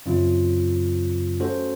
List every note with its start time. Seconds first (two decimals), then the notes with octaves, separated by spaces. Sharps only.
0.06 F#2 C#3 F#3 C4 F4
1.40 A3 C#4 F#4 A4 C5